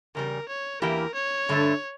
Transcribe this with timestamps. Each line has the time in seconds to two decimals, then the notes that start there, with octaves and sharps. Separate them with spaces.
0.15 E2 C#3 G3 A#4
0.48 C#5
0.82 E2 E3 A#3 E4 G4 A#4
1.14 C#5
1.49 G2 D3 A3